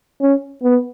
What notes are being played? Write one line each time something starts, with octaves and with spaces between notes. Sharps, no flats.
C#4
B3